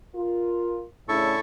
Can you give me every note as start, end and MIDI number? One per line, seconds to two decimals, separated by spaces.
0.15 0.83 65
0.15 0.83 70
1.09 1.35 45
1.09 1.35 49
1.09 1.35 62
1.09 1.40 64
1.09 1.40 69
1.09 1.40 85